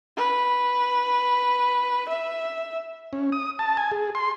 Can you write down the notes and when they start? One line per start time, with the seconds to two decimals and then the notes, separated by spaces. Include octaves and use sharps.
0.17 B4
2.09 E5
3.13 C#4
3.32 D#6
3.59 A5
3.77 G#5
3.91 G#4
4.15 C6